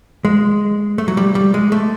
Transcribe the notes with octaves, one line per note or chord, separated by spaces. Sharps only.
G#3
A3
F#3
G3
G3
G#3
A3